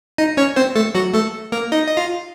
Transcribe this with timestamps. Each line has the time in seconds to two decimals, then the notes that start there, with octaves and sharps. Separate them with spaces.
0.18 D#4 D#5
0.37 C#4 C#5
0.56 C4 C5
0.76 A3 A4
0.95 F#3 F#4
1.14 A3 A4
1.52 A#3 A#4
1.72 D#4 D#5
1.87 D#5
1.97 F4 F5